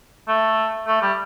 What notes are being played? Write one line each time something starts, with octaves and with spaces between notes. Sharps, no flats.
A3
A3
G3